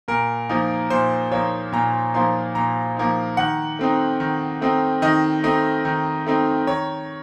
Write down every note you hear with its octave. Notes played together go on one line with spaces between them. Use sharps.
A#2 A#4
F3 A#3 D#4
A#2 C5
F3 A#3 D#4 C#5
A#2 A#5
F3 A#3 D#4 C6
A#2 A#5
F3 A#3 D#4
D#3 F#5
A3 C4 D#4
D#3
A3 C4 D#4
D#3 D#5
A3 C4 D#4
D#3
A3 C4 D#4
D#3 C#5